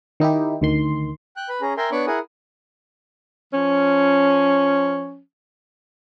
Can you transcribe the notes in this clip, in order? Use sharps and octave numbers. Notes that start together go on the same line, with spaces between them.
D#3 D#4 E4 G4
D2 D#3 C6
G5 F#6
B4 B5
C#4 G#4 A#5
A#4 E5 G5 G#5 A#5 C6
B3 D4 C#5 B5 C#6 D6
E4 G#4 A#4 F#5 G#5 D#6
F3 C#4